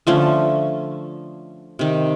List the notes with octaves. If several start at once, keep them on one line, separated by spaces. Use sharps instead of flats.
D3 F3 A3 C#4
C3 D#3